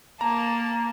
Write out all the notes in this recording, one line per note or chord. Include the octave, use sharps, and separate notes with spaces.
A#3 A5 A#5